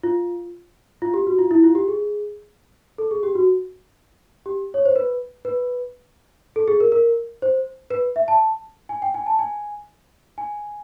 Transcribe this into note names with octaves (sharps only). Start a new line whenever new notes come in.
F4
F4
G4
F#4
F4
E4
F4
G4
G#4
A4
G#4
G4
F#4
G4
C#5
C5
B4
B4
A4
G#4
A#4
A#4
C5
B4
E5
A5
G#5
G5
G#5
A5
G#5
G#5